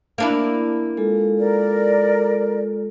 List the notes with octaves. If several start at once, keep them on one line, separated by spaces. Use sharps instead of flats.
A#3 D4 E4
G#3 F4 A4
A#4 D5